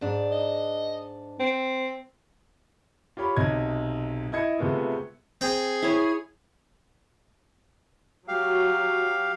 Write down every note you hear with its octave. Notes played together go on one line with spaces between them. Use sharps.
G#2 D4
D#5
C4
F4 G4 C#5 B5
B1 C3 D#5 G#6
E4 D#5 G#6 C#7
C3 G#3 A3 B3 F4
C4 G#4 G5
E4 C#5
F#3 G4 F5